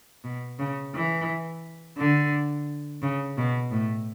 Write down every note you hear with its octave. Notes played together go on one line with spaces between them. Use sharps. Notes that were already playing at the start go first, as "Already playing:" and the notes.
B2
C#3
E3
D3
C#3
B2
A2